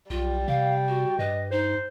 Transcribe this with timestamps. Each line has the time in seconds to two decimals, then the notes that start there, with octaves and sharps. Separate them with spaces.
0.10 B1 G3 F4
0.48 C3 F5 G5
0.88 F#4
1.19 G2 B4 D#5
1.51 D#4 C5